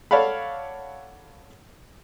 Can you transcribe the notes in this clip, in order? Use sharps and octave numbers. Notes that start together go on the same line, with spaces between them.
A4 C#5 D5 F5 F#5 B5